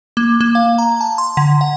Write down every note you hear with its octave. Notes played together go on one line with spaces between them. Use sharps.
A#3
A#3
F5
A#5
A5
C6
D3
F#5